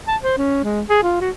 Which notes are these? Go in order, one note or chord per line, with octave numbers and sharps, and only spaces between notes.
A5
C5
C#4
G#3
G#4
F4
F#4